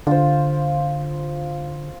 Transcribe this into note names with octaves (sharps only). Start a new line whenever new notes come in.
D3 F4 C5